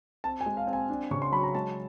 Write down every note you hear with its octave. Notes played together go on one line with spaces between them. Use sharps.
C4 A5
G#5
G#3
F5
C4
G#5
D4
C#3 C#6
C6
F#3 B5
A#5
G#3 A5